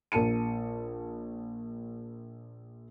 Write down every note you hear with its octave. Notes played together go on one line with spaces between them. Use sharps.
A#1 A#4 A5 C#7 D#7